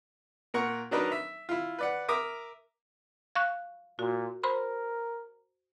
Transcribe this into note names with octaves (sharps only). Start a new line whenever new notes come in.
A#2 A#4 F#5 C#6
F#3 D4 D#4 A#4 B4 D#5
E5
E4 F4
B4 D5 F#5
A#4 E5 D6 D#6
F5 C#6 F#6
A#2 F#4
A#4 C5 B5 C6